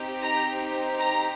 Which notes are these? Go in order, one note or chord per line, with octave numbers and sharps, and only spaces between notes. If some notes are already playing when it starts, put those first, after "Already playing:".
Already playing: C4 D#4 G4
A#5
A#5